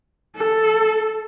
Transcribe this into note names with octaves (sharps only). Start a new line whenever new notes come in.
A4